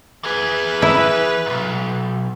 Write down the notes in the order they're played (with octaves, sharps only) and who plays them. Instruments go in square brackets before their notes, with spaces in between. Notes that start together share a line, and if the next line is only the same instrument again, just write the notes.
[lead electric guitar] E3 G#4 [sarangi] B4
[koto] E4
[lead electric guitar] B1 G#2